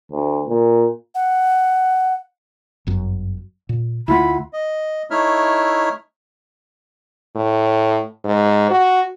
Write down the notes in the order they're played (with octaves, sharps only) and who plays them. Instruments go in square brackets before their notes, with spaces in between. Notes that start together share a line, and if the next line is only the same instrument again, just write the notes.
[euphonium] D2
A#2
[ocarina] F#5
[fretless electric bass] G1 F#2
A#2
[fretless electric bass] D2 A3 [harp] E4 F4 F#5 [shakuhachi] B5
[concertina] D#5
A3 D#4 E4 C#5 E5 F6
[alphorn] A2
G#2
F#4